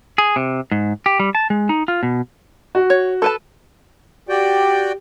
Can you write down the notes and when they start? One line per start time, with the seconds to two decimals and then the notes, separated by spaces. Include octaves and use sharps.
0.18 G#4
0.36 C3
0.71 G#2
1.06 G4
1.19 G3
1.35 A5
1.50 G#3
1.69 D#4
1.88 F4
2.03 B2
2.75 F#4
2.90 C#5
3.22 A4 B4 A5
4.29 F#4 G4 D5 G5